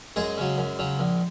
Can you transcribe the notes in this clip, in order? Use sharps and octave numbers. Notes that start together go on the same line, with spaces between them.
F#2 G#3 G#4
C#3 F#3
F#2
C#3 F#3
A#1